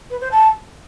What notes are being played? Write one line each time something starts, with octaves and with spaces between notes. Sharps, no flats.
B4
C5
A5